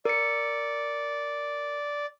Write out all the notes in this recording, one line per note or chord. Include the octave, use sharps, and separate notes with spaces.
A#4 D5 C#7